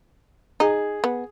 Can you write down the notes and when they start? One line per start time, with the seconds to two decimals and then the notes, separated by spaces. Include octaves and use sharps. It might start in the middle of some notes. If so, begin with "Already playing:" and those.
0.60 D#4 G#4
1.04 B3